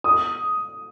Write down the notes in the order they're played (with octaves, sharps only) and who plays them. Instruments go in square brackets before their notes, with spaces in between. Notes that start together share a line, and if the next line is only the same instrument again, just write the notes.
[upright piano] D#6